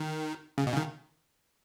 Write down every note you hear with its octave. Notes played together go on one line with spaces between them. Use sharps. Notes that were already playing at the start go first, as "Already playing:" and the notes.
Already playing: D#3
C#3
B2
C#3
D#3